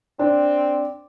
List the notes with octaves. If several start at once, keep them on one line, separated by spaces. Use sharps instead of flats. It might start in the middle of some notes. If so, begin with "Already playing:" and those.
C4 D4